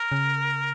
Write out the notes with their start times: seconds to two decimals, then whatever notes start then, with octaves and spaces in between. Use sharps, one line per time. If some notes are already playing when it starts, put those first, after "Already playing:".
Already playing: A#4
0.12 C#3